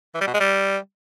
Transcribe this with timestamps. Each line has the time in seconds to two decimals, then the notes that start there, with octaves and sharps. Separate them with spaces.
0.15 E3
0.21 G3
0.27 B2
0.34 G#3
0.40 G3